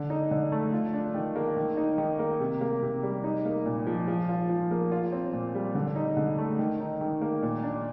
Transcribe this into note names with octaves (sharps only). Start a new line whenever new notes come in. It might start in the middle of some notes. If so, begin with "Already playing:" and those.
Already playing: D3
D#4
D3
A3
F4
D4
D#3
A#3
D#3
D#4
D#3
A#3
C3
A#3
C3
G3
D#4
A#3
A#2
F3
F3
F4
F3
A#3
F4
C4
A#2
G3
D3
D#4
D3
A3
D#3
D#4
D#3
A#3
A#2
D4